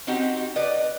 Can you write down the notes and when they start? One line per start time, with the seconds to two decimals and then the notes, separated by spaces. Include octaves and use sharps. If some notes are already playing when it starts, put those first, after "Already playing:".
0.07 C4 C#4 D#4 F#4 G4
0.56 B4 D5 D#5